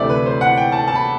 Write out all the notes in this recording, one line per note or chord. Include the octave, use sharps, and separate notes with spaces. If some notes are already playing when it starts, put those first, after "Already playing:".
Already playing: D2 C3 E3 A3 C4 D5 E5
B4
C5
F#5
G5
A5
A5
B5